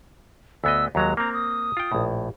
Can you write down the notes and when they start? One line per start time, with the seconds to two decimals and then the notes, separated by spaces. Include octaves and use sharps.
0.64 D2 B3 D#5 E6
0.95 D#2 F#3 G#3 A#5
1.17 A#3 C4 A#5
1.33 D#6
1.77 F4 G5
1.92 A#1 A2